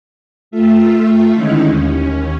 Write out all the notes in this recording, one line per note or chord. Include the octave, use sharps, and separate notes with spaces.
A3 F4 E5
D3 D#3 G#3 C#4 D#4 E4
D#2 C#4